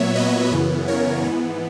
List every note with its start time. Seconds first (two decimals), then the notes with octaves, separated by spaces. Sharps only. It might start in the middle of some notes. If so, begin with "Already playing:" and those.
Already playing: A#2 F#3 B3 C#5 E5
0.15 B4 D#5
0.51 F#2 C#3 E3 B3
0.88 A#4 C#5
1.24 G#2 E3 B3